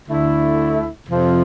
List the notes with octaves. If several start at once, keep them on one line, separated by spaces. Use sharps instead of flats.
D2 D3 A3 E4
F2 C3 F3